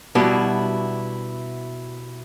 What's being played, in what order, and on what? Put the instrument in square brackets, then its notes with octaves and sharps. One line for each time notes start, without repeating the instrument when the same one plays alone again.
[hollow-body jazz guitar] B2 G3 B3 D4 E4 F#4